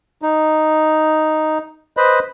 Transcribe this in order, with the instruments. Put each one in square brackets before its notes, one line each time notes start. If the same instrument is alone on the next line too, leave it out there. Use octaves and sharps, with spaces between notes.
[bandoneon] D#4
B4 C5 D#5 B5